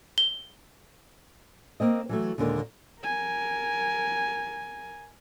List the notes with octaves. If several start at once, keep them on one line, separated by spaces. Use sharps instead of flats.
G7
A#3 C4 D#5
E3 F#3 A3
D#2 A#2 D3 G#3 A#4
A#4 G#5